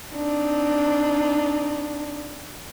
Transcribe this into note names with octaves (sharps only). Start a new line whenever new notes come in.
C4 D4 D#4